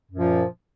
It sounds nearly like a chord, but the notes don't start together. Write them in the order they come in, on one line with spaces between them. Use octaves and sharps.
F#2 A#2 F3